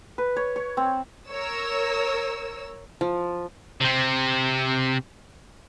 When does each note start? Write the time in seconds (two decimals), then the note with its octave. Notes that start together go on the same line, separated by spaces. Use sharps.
0.18 B4
0.36 C#5
0.56 C#5
0.77 C4
1.29 A#4 C#5 E6
3.01 F3
3.81 C3 C4